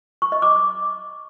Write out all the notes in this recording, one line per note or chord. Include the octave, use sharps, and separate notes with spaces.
C#6
D#5
D6